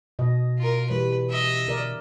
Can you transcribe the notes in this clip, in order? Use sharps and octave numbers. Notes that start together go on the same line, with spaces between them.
B2 D#5
F4 A#4
E3 G3 B4 C#5
D#5 E5
D3 A#4 D5